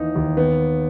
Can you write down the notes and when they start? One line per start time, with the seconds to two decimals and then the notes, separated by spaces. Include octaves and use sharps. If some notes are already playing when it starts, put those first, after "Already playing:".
Already playing: D#2 D#3 E3 D#4
0.15 D#2
0.37 D#3 B3